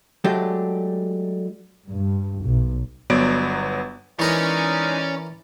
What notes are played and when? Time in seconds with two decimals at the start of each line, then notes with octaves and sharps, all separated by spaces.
0.24 F#3 G#3 A3 D4 G4
1.89 G2
2.44 B1
3.10 G1 F#3 B3 B4 D5 D7
4.19 E3 G#3 C#4 D#4 A#4 C#5 D5 A#5